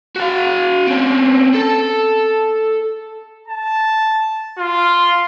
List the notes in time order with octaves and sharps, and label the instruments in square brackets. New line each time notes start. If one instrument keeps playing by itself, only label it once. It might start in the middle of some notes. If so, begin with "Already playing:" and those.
[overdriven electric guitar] F#4 F5
C4 C#4
A4
[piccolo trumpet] A5
F4